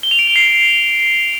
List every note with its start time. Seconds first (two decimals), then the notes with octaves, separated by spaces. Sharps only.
0.03 G7
0.11 F7
0.19 D7
0.27 F7
0.36 C7